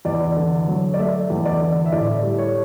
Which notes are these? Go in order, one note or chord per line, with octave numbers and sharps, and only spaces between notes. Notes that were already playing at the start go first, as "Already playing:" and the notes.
E2 D5
D3
F#3
D5
A3 E5
E2
D5
D3
E5
A2 D5
G3
C#5